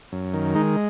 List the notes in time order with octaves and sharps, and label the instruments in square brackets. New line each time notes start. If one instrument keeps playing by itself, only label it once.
[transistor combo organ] F#2
D#3
G#3 D#4